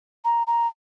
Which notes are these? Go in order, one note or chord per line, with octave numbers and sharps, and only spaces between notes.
A#5
A#5